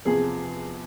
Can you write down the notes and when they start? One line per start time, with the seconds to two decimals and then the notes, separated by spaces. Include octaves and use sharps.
0.05 E2 C3 F3 G#4